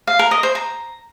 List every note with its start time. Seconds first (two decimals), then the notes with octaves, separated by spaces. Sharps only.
0.07 F5
0.19 A#4
0.31 D#5
0.43 C5
0.55 A#5